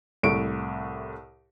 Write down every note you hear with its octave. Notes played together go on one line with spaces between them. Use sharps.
C2 A2 C#6 D7